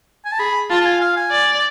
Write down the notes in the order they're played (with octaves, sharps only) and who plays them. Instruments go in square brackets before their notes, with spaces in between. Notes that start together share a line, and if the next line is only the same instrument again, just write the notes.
[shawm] G#5
A5
[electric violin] G#4 [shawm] B5
[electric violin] F4 [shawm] A5
[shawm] A5
G#5
F5
G#5
[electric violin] D5